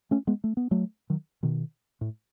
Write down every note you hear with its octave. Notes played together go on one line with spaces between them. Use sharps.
A3 C#4
G#3 B3
A3
B3
F#3 A3
D#3 F#3
B2 D#3
A2